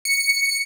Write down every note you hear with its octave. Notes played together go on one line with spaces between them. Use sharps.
C#7